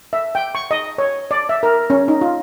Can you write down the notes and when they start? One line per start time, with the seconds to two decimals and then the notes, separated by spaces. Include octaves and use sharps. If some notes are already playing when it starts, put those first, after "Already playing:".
0.13 E5
0.35 G5
0.55 C#6
0.71 D#5
0.98 C#5
1.31 D5
1.49 E5
1.63 A#4
1.90 C#4
2.08 D#4
2.21 F4